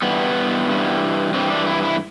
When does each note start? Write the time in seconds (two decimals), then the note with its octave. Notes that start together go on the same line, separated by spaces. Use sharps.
0.02 G2 E3 G3 B3
0.68 G2 E3 G3
1.33 G2 E3 G3 C4
1.50 D4
1.67 E4
1.83 E4